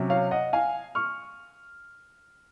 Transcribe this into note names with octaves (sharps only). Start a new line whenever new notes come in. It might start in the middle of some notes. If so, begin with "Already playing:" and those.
Already playing: C3 F#3 C#4
C#5 F5
D#5 F#5
F5 G#5
C#6 F6